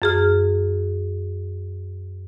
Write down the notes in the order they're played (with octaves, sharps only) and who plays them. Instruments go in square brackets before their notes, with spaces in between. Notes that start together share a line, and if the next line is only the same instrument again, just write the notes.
[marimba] F#2 G#4 F6